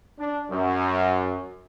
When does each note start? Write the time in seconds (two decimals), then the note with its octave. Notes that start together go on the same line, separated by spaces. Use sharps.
0.18 D4
0.50 F#2